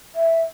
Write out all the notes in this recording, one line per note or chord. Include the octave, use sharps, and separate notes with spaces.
E5